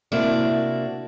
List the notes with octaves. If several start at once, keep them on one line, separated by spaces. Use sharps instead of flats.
C3 A#3 D4 E4 F#4 D5